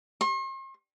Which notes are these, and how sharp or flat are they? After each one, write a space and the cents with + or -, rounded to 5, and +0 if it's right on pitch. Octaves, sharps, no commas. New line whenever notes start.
C6 +45